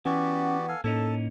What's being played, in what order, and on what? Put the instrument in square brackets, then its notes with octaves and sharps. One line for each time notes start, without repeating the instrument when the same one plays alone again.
[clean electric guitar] E3 [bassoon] B3 [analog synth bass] C#4 [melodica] F#4 G4 D5
[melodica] A4 F5 G#5
[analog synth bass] A2 [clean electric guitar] A#3 C#4 D#4 [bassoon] A4 [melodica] A5